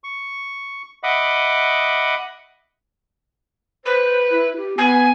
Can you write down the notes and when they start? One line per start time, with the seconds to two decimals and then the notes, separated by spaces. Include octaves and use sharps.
0.04 C#6
1.03 D#5 E5 F#5 B5 D6 D#6
3.85 B4 C5
4.31 E4
4.56 G4
4.78 B3 G#5